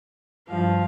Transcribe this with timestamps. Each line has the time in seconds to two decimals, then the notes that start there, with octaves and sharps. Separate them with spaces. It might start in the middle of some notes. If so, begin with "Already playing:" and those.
0.49 G2 F3 F5